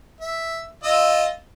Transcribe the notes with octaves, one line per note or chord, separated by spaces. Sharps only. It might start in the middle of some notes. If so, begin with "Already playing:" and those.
E5
F4 D#5 E6